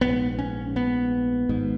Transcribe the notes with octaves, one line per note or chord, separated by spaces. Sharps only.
A#1 G#2 B3
C#4
B3
G#1 G#2